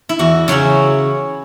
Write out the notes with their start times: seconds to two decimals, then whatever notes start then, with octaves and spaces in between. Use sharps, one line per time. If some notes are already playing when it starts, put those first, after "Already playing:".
0.09 E4
0.19 E2 F#4
0.48 C#3 F#3 C#4 E4